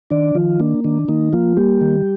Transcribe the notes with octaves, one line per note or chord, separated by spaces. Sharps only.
D#3 D4 D5
D#3 F3 F4
A#3 D4
D#3 D4
D#3 A#3 D#4
F3 A#3 F4
G3 A#3 G4
D#3